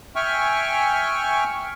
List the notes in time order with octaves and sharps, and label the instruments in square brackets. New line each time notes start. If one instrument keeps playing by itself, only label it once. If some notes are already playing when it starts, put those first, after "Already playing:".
[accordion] E5 G5 G#5 C#6 F6